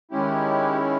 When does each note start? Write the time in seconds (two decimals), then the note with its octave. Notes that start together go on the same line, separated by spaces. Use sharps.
0.11 D#3 G#3 C#4 E4 G4